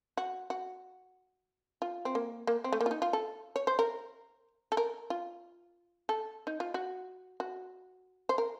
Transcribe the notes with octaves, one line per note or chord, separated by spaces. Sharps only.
F#4
F#4
F4
C4
A#3
A#3
C4
A3
A#3
F4
D#4
F4
A4
C#5
C5
A#4
A4
A#4
F4
A4
D#4
F4
F#4
F#4
C5
A#4